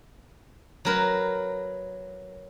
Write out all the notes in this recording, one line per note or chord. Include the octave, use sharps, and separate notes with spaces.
F#3 A#4 B4